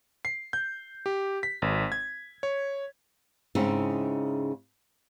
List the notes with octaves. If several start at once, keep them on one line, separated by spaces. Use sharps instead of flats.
C7
G6
G4
B6
G#1
G#6
C#5
G#2 C#3 C4 C#4 D#4 E4